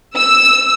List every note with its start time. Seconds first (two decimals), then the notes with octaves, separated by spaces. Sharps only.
0.16 E6